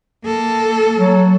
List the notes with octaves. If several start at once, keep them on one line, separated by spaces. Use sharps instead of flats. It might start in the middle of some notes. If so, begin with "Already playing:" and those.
A#3 A4
F#3